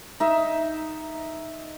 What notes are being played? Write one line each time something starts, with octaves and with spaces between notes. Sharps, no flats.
D#4 E5